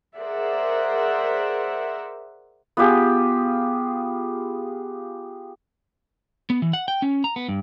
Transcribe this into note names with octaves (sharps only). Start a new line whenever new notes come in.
G#4 A#4 C5 D5 E5 F#5
B3 F4 G4 G#4
B3
E3
F#5
G5
C#4
A#5
B3
G2